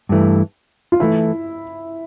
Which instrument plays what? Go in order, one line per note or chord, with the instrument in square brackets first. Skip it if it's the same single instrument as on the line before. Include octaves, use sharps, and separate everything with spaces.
[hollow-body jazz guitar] G2 E3 A3
[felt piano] F4
[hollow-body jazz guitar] E3 A3 [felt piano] E4